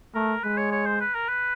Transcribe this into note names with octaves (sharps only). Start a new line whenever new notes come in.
A3 A#4
G#3 B4
C#5
C#5
C5
B4
A#4
B4